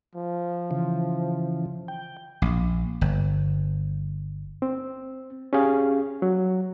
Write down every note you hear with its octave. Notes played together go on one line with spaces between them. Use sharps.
F3
C#3 E3
G5
A#1
G1
C4
C#4 G4 G#4 F5
F#3